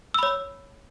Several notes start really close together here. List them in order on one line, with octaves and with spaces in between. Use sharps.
E6 B5 C#5